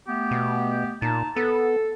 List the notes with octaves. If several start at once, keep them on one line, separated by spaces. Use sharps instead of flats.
A3 B3 G4
B2
A#2 D#4 A5
B3 A4